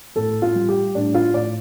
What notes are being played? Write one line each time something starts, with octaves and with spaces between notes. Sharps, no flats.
A2 A4
F4
G3
G4
A2 D4
F4
A2 D5